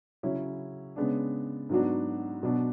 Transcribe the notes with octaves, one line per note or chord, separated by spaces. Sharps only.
C#3 F#3 C#4 E4
C#3 G#3 B3 D4
G#2 F#3 B3 D4 F#4
B2 F#3 B3 D4